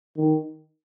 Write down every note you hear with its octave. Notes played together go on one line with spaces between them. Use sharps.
D#3